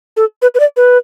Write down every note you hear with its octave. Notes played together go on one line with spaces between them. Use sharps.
A4
B4
B4
D5
B4